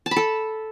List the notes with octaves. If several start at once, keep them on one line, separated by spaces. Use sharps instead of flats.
A5
B5
A4